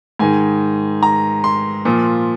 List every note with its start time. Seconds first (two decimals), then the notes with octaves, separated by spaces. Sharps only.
0.19 G#2 D#3 G#5
1.03 A#5
1.44 C6
1.85 A#2 F3